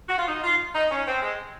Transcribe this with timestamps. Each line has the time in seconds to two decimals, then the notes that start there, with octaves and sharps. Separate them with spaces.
0.09 F#4
0.18 F4
0.28 D#4
0.44 F4
0.74 D#4
0.91 C#4
1.07 C4
1.22 G#3